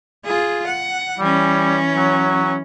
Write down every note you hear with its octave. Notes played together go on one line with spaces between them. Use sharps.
F4 G#4
F#5
E3 G3 C#4
F#3